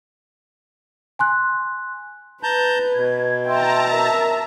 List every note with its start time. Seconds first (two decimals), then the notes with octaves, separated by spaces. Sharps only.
1.19 G#5 C6 F#6
2.43 B4 A5 A#5 G6
2.95 B2 G#6
3.47 E5 G5 A5 A#5 C6 E6
3.91 A#4 E5